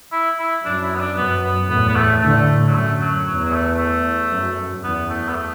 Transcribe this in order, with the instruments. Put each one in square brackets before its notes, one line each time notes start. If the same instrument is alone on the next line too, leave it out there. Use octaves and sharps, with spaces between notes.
[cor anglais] E4
E4
[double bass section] F#2 [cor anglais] D4
[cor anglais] E4
B3
D4
[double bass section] F#2 [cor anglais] B3
[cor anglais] B3
[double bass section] E2 A2 [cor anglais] B3
[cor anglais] B3
A3
[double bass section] A2 D3 [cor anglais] A3
[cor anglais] F#3
[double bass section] F#2 [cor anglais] A3
[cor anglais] F#3
[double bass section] E2 [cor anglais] F#3
[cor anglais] F#3
A3
A3
[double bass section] F#2
[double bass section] E2 [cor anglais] B3
[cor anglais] A3
B3
A3